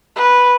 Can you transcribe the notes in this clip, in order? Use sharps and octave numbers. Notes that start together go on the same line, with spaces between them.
B4